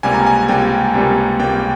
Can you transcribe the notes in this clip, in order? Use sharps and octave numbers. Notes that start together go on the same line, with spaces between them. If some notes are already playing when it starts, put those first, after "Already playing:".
C#2 C3 G3 A#3 G#5
A#5
G#5
C#2 C3 G3 A#3 G5
C#2 C3 G3 A#3
C#2 C3 G3 A#3 G5